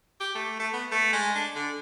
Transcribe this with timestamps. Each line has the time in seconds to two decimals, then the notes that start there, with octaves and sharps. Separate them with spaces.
0.20 G4
0.35 A3
0.59 A3
0.73 B3
0.91 A3
1.13 G#3
1.35 D4
1.55 D3